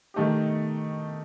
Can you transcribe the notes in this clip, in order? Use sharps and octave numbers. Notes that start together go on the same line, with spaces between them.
D#3 A3 D#4 G4